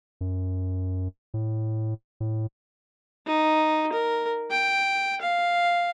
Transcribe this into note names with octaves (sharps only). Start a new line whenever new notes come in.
F#2
A2
A2
D#4
A#4
G5
F5